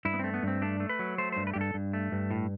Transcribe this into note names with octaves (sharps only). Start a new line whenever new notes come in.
G2 E4
B3
A3 C4
B3
G2 C4
A3 D4
A3
B4
F#3
A3 C5
G2 C5
B4
G2 G4
A4
G2
A3
G2
A2